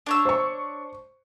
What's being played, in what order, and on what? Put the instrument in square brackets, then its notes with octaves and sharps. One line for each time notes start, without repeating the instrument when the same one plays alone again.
[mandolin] D4 C#5 E6
[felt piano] C5 C#6